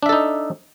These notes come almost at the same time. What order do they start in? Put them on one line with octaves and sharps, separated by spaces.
D4 E5 A4 D#4